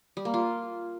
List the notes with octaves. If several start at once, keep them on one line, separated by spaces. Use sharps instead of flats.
G3
A#3
F4